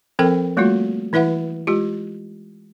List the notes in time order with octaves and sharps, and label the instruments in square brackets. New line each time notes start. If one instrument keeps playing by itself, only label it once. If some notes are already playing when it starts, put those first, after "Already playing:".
[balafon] F3 C4 A4 A#4 G5
G3 A3 A#3 F4 F#4
E3 E4 B4 E5 F#5
G#3 F4 G4